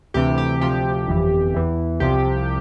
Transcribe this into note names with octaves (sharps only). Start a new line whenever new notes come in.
D2 C3 E3 G4
G4
D2 C3 F3 G4
G1 F2 E3
E2 E3
C2 C3 F3 G4